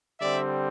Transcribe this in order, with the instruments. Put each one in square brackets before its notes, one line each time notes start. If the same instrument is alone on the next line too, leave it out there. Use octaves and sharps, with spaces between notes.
[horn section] D3 G3 C4 D5 E5